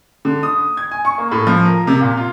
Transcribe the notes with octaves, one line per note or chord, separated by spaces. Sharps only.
D3
D#6
G#6
G#5
C#6
A#3
A2
F3
A#4
C3
A#2
F4